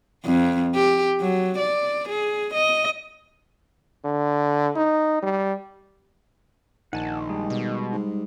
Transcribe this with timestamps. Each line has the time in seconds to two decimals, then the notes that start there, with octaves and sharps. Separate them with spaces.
0.25 F2
0.75 G4
1.20 F#3
1.58 D5
2.09 G#4
2.54 D#5
4.05 D3
4.76 D#4
5.23 G3
6.93 A#1 D#3 F#5 G#5 A5
7.30 G3 G#3
7.50 B2
7.92 G#2